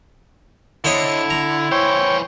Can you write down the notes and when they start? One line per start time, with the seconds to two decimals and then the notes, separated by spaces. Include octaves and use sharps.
0.84 D3 E4 C5 C#5 D#5
1.30 A#5
1.72 E3 C5 C#5 G5